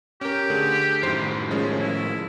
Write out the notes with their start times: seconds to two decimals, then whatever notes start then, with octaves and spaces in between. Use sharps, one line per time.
0.21 C#4 G4 A#4
0.50 D3 A3 G#4
1.03 F#2 A2 D#3 C5 C7
1.51 F3 G#3 C#4
1.79 E4